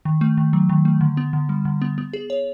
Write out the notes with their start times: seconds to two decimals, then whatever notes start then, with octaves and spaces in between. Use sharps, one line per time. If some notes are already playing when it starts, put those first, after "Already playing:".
0.05 D#3
0.21 A3
0.37 D#3
0.53 F#3
0.69 D#3
0.85 A3
1.01 D3
1.17 B3
1.33 D3
1.49 G3
1.65 D3
1.82 B3
1.98 B3
2.13 G#4
2.30 C#5